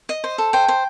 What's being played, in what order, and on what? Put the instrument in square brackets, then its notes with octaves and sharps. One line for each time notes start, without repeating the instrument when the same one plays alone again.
[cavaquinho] D#5
C5
A4
C5 G5
C5